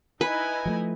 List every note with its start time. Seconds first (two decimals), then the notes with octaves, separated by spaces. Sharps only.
0.21 D#4 E4 B4 D#5 G#5
0.65 F3 F#3 A3